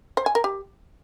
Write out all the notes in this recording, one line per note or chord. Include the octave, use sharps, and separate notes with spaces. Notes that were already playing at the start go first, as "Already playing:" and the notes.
C5
G#5
A#4
G4